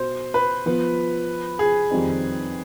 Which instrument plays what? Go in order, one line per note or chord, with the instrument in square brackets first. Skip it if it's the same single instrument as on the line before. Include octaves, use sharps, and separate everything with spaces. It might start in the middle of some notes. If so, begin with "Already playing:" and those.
Already playing: [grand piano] B2 [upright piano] C5
[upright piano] B4
[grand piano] F3 B3 F4
[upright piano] G#4
[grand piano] F2 D#3 G3 C4 D#4